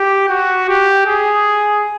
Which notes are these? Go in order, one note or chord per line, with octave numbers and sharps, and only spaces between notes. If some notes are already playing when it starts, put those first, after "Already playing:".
Already playing: G4
F#4
G4
G#4